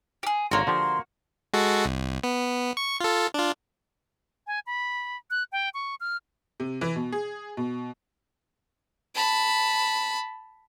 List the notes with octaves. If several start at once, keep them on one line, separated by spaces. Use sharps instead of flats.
G4 G#4
G#1 D3 A#3 F#4 C#5 C6
D3 F3 G4 C6
G#3 F#4 A4
C2
B3
C#6
F4 A4
D4 F4
G#5
B5
F#6
G5
C#6
F6
C3
E3
B2
G#4
B2
A5 B5